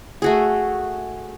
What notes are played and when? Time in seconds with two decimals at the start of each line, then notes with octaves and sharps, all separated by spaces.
0.22 A3 F#4 G#4